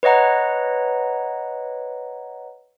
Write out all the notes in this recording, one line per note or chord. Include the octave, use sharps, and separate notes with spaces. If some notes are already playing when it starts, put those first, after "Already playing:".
B4 C#5 D#5 F#5 A#5